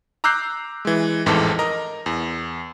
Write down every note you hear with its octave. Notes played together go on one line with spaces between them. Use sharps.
A#5 D6 E6 F#6 G6 C7
E3 G#3
A1 F2 G#2 E3 A4 D6
A#4 D#5 A#5
E2